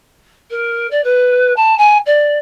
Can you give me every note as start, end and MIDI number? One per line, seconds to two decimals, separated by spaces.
0.50 0.87 70
0.91 1.03 74
1.04 1.53 71
1.56 1.77 81
1.78 1.98 80
2.06 2.38 74